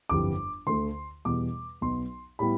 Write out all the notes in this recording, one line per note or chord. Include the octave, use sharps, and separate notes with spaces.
G1 F2 E3 G3 D6
D2 D3 A3 C6
E2 B2 G3 B3 D6
B1 B2 B3 C6
A2 G3 B3 E4 B5